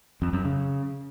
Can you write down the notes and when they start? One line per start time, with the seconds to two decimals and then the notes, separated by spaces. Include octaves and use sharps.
0.22 F2
0.33 F#2
0.45 C#3